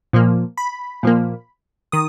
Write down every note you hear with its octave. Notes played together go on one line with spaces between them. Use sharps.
A#2 F3 A#3
B5
A#2 F3 A#3
D#3 D#6